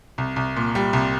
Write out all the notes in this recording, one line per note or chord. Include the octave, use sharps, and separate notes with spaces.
C2
C2
A#2
G3
C2